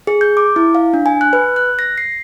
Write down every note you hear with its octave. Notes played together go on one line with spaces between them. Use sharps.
G#4
G6
D6
E4
F5
D4
G#5
F#6
B4
F#6
A#6
C7